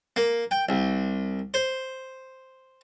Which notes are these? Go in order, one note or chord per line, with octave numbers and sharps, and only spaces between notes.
A#3
G5
C2
C5